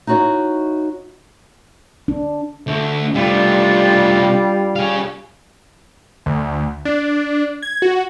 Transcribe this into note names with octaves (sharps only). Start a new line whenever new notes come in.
D#4 E4 F#4 C#5 D#5
D4
D2 A3
C3 G3 A3 D4 F4
G#4 F5
D2
D4
G#6
F#4